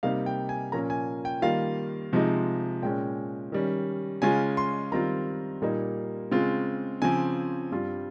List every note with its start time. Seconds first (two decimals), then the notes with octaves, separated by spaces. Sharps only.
0.03 C3 G3 A#3 D#4 F5
0.26 G5
0.49 G#5
0.72 A#2 F3 A#3 C#4 A#5
0.90 G#5
1.25 G5
1.42 D#3 G3 A#3 F4 F5
2.13 C3 F3 G#3 D#4
2.82 A#2 G#3 C#4 G5
3.52 D#3 G3 C#4
4.22 C#3 G#3 C#4 F4 G#5
4.57 C6
4.92 D#3 G3 C4 F4 A#5
5.62 A#2 G3 A#3 D#4
6.31 C#3 G#3 C4 F4
7.02 C#3 F3 C4 G#5
7.72 G2 G3 C4 F4